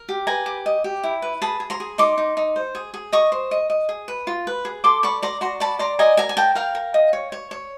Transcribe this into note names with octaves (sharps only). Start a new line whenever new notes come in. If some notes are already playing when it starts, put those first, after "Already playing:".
Already playing: A#4
G4
B4 G#5 A#5
G4
D#5
G4
E4
B4
G#4 A5 B5
G#4
A#5 C6
G#4
D#4 C6 D6
D#4
D#4
C5
G#4
G#4
D#5 C#6 D#6
C5
D#5
D#5
G#4
B4
F4
B4
G#4
A4 C6 D6
D5 B5 C#6
D5 A#5 C6
F#4 A#5 C6
D5 A5 B5
D5 A#5 C6
D#5 G#5 A#5
A#4 G#5 A#5
G#5
A#4 G5 A5
A#4 F5 G5
A#4
D#5
C#5
C#5
C#5